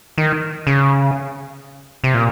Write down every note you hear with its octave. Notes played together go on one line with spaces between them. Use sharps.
D#3
C#3
C3
A#2